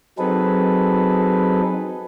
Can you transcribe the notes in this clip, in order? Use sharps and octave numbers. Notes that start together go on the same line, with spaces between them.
F#3 C4 D#4 G#4 A4 B4